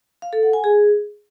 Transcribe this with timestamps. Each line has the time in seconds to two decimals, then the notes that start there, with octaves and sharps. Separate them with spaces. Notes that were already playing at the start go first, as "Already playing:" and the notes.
0.22 F5
0.33 A4
0.43 F#5
0.53 G#5
0.64 G#4